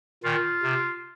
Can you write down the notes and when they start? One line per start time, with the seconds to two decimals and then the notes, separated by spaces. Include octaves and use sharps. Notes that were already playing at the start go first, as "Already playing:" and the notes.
0.24 A#2 D#3 F4
0.63 C3